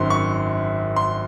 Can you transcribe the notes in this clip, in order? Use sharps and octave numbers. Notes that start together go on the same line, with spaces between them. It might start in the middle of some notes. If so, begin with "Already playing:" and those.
Already playing: G#1 F#2 D#3 C6
C#6
C6